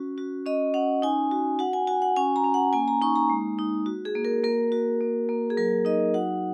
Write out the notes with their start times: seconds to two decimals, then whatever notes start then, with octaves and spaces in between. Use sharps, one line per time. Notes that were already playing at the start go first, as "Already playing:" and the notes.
Already playing: C#4 F#4
0.18 F#4
0.46 C#4 D#5
0.74 C#4 F#5
1.02 D#4 G#5
1.31 F#4
1.59 F#4 F#5
1.73 G#5
1.87 F#4 G#5
2.02 F#5
2.16 C#4 G#5
2.36 A#5
2.44 C#4
2.54 F#5
2.73 A#3 G#5
2.88 A#5
3.02 D#4 C#6
3.16 A#5
3.29 G#3
3.59 D#4
3.86 F#4
4.05 G#4
4.15 A#3
4.25 A#4
4.44 A#3 A#4
4.72 F#4
5.01 A#3
5.29 A#3
5.50 G#4
5.57 F#3 A#4
5.85 D#4 D#5
6.14 F#4 F#5